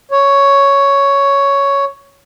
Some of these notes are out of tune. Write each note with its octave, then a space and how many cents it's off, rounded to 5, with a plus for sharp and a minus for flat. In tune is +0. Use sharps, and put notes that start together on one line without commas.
C#5 +5